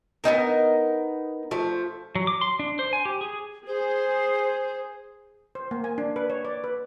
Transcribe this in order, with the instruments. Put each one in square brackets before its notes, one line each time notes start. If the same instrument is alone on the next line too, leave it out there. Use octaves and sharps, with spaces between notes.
[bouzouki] B3 C#4 D#4 A#4
F3 A3
[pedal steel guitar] F#3
D6
C6
D4
C5
G#5
G4
G#4
[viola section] G#4 [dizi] C5
[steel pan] C5
A#3
G#5
D4
B4
C#5
D5
B4